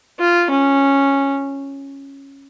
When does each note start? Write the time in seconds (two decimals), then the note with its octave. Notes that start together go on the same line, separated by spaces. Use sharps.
0.20 F4
0.50 C#4